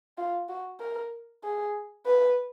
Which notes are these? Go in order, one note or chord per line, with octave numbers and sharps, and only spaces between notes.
F4
F#4
A#4
G#4
B4